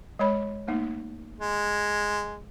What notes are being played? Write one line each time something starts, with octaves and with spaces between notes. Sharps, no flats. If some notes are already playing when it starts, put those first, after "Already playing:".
G#3 C#5 B5
A3 A#3 D#4
G#3